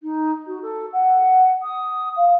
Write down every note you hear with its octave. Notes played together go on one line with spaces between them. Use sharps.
D#4
F#4
A4
F#5
D#6
F5